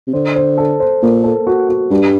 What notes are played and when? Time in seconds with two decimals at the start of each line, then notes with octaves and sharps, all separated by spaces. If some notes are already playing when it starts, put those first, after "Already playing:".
0.07 C3
0.13 D3 C5
0.35 C5
0.58 A4
0.80 C5
1.02 A#2 A#3
1.24 A4
1.47 F#4
1.69 F#4
1.91 G2 G3